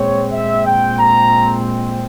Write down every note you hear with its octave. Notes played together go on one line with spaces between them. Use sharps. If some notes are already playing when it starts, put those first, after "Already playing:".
Already playing: A#2 G#3 C4 C#5
E5
G5
A#5